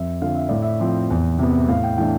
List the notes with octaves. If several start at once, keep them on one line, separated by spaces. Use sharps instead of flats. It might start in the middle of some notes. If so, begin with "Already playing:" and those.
Already playing: F2 E5
D3 F3 C4 F5
E5
A2 D5
E5
F3 C4
E2
C3 E3 B3
A2 F5
G5
E3 A3 D4 G5